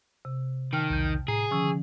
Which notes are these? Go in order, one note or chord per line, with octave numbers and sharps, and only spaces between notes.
C3
D#3 G5 A5 F6
B1 E2 G6
A2 G#4 A#5 C7
D3 D#3 F3 C#4 C#6 E6